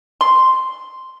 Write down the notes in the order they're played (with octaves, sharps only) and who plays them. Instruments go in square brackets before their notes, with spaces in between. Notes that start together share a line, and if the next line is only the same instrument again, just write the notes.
[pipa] C6